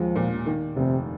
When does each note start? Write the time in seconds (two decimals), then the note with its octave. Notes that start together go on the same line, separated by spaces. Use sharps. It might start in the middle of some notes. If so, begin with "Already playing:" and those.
Already playing: D#2 F3 G#3
0.16 A#2
0.46 D#3
0.76 F1 C3